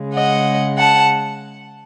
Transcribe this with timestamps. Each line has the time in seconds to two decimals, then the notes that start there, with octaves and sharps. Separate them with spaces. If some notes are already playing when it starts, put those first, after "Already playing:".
Already playing: C#3 G#3
0.14 D#5 F#5
0.77 F#5 A5